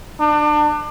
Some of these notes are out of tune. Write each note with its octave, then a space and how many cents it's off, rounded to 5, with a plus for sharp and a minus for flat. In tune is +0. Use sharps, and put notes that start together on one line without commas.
D4 +30